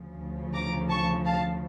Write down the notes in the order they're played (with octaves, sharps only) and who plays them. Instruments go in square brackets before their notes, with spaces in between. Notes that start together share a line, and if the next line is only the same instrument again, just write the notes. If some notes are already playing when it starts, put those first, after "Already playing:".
Already playing: [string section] D2 C#3 F3
A#5 D6
A5 C#6
F5 A5